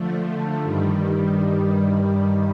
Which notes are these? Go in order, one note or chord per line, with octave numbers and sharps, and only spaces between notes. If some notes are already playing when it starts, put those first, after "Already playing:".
Already playing: D3 F3 A3
G2 D#3 G3